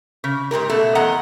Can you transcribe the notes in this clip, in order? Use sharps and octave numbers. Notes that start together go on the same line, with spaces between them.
C#3
G#2 B2 G4 A#4
B2 A3 A4
E2 D#5 F#5 A#5